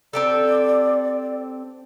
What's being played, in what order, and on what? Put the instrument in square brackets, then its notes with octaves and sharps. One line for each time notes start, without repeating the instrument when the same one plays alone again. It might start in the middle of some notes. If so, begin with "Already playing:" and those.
[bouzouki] C4 G4 A4 [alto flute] D5